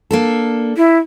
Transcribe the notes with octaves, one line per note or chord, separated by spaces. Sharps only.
A#3 D4 A4
E4